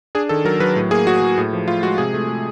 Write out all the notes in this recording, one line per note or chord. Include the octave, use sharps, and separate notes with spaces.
D4 G#4
D#3 A4
F#3 A#4
F#3 B4
A2
A#3 G#4
F#3 F#4
F#3
A2
F3
A2 F4
G#3 F#4
C3 G#4
A3
A3